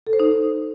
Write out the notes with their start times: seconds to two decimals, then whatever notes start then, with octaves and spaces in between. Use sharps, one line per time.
0.07 A4
0.13 C5
0.20 D#4